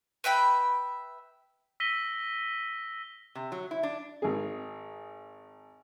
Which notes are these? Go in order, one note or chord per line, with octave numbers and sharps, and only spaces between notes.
B4 E5 G5 B5
E6 A#6 B6 D#7 G7
C3
F#3
E4
D4
G#1 G#4